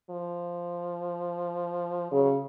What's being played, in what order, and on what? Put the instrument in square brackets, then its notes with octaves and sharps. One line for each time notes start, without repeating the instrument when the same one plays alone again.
[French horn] F3
[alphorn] C#3 [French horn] F#3